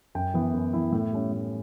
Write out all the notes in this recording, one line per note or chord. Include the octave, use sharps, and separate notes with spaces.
F#2 G5
E3 B3 E4
F#2
E3 B3 E4
A2
G3 C#4
A2